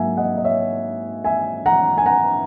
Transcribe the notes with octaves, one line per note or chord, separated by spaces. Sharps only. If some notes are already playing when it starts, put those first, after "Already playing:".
Already playing: G#2 F#3 A#3 E5 F#5 G#5
D#5 F#5
D#5
C#5 E5
E5 G#5
F#5 A#5
G#5
F#5 A#5